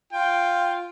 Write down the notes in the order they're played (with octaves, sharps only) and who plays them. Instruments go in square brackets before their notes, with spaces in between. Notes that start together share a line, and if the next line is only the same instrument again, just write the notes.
[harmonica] F4 G5